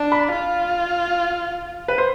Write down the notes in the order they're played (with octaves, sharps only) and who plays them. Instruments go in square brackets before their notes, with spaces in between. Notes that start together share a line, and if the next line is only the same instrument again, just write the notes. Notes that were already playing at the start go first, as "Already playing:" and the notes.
Already playing: [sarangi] D4
[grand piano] B5
[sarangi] F4
[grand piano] B4
C5